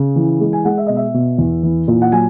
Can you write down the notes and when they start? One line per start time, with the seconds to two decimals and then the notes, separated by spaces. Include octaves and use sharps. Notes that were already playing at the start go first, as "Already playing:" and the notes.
Already playing: C#3
0.16 E3
0.41 G#3
0.53 G#5
0.65 G#3 F#5
0.78 E5
0.87 B2 D#5
0.96 E5
1.14 B2
1.38 E2
1.63 E3
1.88 A#2
2.02 F#5
2.12 F#3 G#5